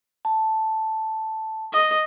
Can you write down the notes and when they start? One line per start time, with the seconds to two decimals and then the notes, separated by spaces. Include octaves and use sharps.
0.25 A5
1.73 D#5